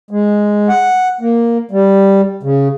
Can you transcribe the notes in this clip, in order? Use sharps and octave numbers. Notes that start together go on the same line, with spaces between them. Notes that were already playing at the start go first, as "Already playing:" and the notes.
G#3
F#5
A#3
G3
C#3